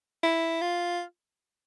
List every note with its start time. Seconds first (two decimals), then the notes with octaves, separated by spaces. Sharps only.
0.23 E4
0.61 F4